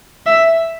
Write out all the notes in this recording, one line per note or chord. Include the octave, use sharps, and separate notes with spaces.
E5